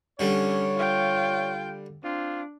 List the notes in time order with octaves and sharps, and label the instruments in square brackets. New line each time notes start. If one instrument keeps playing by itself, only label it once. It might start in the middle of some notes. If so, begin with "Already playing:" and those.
[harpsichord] D3 G3 [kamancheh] C#4 [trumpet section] C#5
[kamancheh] F4 G5
[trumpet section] C4 F4 [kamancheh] D4